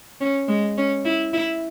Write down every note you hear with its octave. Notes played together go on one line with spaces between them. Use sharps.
C#4
G#3
C#4
E4
E4